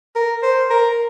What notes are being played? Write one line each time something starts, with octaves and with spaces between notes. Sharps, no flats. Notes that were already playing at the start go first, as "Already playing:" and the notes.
A#4
C5
A#4